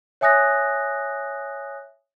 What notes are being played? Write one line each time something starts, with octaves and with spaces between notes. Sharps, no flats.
C#5 E5 G#5 D#6 F#6 A#6